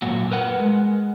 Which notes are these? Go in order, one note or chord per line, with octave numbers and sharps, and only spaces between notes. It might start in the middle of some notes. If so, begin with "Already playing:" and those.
F#2 A#2 F#4
A#4 B4 F#5
G#3